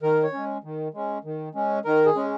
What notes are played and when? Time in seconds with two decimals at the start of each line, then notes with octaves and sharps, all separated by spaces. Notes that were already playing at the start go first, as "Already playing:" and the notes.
0.02 D#3 A#4
0.23 C#5
0.33 G#3 C#4
0.64 D#3
0.94 G#3 C#4
1.25 D#3
1.55 G#3 C#4
1.85 D#3 A#4
2.06 G#4
2.15 G#3 C#4